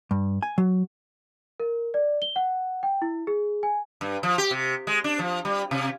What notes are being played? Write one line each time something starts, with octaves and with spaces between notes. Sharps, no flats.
G2
G#5
F#3
A#4
D5
G7
F#5
G5
E4
G#4
G#5
G2
F3
G4
C3
G#3
D4
F3
G3
C3